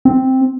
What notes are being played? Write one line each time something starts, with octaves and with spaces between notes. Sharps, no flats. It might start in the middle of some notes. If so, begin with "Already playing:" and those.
C4